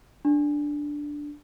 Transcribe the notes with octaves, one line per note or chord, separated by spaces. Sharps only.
D4